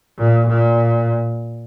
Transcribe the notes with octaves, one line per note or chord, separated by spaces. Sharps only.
A#2
A#2